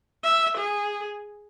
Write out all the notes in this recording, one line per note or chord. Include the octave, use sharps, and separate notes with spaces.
E5
G#4